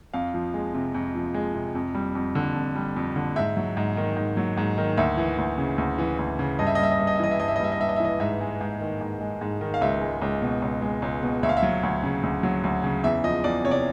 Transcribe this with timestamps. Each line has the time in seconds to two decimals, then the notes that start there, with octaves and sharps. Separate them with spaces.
0.14 F2 F5
0.34 F3
0.54 G#3
0.74 C3
0.94 F2
1.15 F3
1.34 G#3
1.55 C3
1.75 F2
1.95 G3
2.15 F2
2.35 D3
2.56 F2
2.75 G3
2.96 F2
3.16 D3
3.36 G#2 E5
3.57 F#3
3.77 G#2
3.97 D#3
4.17 G#2
4.37 F#3
4.57 G#2
4.78 D#3
4.97 D2 E5
5.17 E3
5.38 D2
5.58 C#3
5.78 D2
5.98 E3
6.19 D2
6.39 C#3
6.59 G2 D#5
6.67 E5
6.75 D#5
6.79 G3 E5
6.91 D#5
6.99 G2 E5
7.07 D#5
7.16 E5
7.20 E3 D#5
7.31 E5
7.39 G2 D#5
7.48 E5
7.56 D#5
7.60 G3 E5
7.72 D#5
7.80 G2 E5
7.89 D#5
7.96 E5
8.00 E3 D#5
8.20 G#2 E5
8.41 G#3
8.61 G#2
8.81 D#3
9.01 G#2
9.21 G#3
9.41 G#2
9.61 D#3
9.74 F5
9.81 C#2 E5
10.01 G#3
10.22 C#2
10.42 B2
10.62 C#2
10.82 G#3
11.02 C#2
11.23 B2
11.43 D2 E5
11.49 F5
11.57 E5
11.63 F#3
11.83 D2
12.03 C#3
12.23 D2
12.43 F#3
12.64 D2
12.84 C#3
13.04 E2 E5
13.24 F3 D#5
13.44 E2 D5
13.64 C3 C#5
13.71 D5